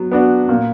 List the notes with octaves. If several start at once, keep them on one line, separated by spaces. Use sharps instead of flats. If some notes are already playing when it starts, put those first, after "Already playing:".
Already playing: F#3 B3
B3 D4 F#4
A#2